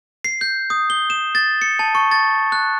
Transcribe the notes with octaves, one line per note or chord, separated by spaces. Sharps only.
C7
G6
D#6
G7
E7
A6
C#7
A5
C#6
A6
F#6